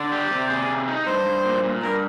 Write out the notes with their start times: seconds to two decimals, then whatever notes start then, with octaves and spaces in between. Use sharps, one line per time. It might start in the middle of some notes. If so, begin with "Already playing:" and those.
Already playing: D3 D5
0.12 G4
0.31 C3
0.50 G#4
0.69 C3
0.88 D#4
1.06 G2 C5
1.26 G2
1.45 A#2
1.64 A#2
1.82 G2 A#4